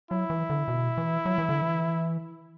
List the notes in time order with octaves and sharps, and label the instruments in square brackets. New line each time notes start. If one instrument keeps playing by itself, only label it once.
[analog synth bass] F#3 [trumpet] E4
[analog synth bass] E3
D3
B2
E3
F#3
E3
D3
E3